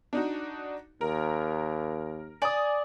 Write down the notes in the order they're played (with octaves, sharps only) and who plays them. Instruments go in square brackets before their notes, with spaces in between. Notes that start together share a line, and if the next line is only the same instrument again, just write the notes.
[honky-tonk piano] D4 D#4 F#4
[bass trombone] D#2 [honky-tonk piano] A#4
[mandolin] D5 [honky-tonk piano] G#5 D#6